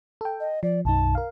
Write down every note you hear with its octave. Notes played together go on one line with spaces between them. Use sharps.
A4 G5
D#5
F3 D5
B1 F#2 D#4 A5
A#4 F5